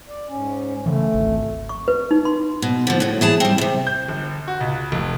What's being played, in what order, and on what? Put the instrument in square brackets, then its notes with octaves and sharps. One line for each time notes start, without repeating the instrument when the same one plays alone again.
[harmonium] D5
G#2 C#4
[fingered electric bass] C#3 E3 [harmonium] A3
[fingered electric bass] G#1 C#2
[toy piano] C#6
B4
D#4
C6
[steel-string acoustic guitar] B2
D3 F3
A2 F#3
E3 G#4 A5
G3 C4
E2 C3
[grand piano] G6
G1
F#4
C#2
F1